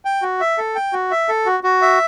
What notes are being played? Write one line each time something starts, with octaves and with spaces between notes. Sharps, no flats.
G5
F#4
E5
A4
G5
F#4
E5
A4
F#4
F#4
E5